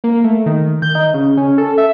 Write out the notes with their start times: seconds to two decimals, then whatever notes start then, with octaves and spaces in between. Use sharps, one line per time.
0.04 A#3
0.24 A3
0.46 D#3
0.82 G6
0.95 D#4
1.14 C#3
1.37 C#4
1.58 A4
1.78 E5